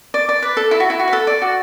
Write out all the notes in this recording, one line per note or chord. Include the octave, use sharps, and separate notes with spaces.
D5
D5
B4
A4
E4
F#4
E4
F#4
B4
A4
D5
F#4